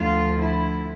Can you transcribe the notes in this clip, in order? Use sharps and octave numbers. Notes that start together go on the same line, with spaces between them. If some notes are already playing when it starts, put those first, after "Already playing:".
Already playing: D2 D3 F3 F4
E4